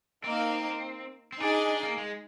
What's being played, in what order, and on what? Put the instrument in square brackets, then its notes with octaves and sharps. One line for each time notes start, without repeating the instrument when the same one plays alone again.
[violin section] A#3 D#4 A#4 F5 [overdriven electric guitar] C4
[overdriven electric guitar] C4
[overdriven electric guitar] D4 [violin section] D#4 G#4 D#5 G#5
[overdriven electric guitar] D4
D4
A#3
G#3